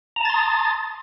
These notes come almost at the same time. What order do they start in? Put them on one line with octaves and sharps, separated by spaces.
A#5 A5 A6 C6 D#6